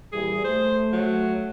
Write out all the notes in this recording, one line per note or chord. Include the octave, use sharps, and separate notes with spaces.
A#2 E3 G3 G#4
A3 C5
F#3